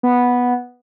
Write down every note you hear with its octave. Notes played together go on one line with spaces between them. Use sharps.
B3